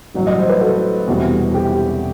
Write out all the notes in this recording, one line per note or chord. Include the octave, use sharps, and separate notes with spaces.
A1 G2 F#3
D#5
C5
B4
F#4 A4
E1 E2 C3 E3 G3 F#4
G4